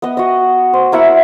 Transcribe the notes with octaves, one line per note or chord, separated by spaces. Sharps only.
B3 D#5
F#4 D#5
C5
A#3 E4 E5 F#5